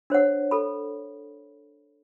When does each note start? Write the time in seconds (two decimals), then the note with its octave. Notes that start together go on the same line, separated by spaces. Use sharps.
0.10 D4 C5 C#5 F#5
0.51 A4 B5